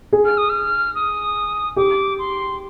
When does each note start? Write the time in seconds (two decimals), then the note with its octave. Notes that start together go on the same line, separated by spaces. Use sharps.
0.13 G#4
0.24 F6
0.37 D#6
0.49 F6
0.95 D#6
1.76 G4 D6
2.18 C6